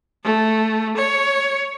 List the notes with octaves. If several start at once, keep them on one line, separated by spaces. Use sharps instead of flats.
A3
C#5